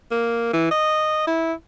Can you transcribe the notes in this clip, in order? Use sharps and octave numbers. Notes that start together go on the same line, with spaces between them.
A#3
E3
D#5
E4